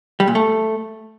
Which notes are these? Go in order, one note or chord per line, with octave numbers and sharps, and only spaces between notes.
G3
A#2
A3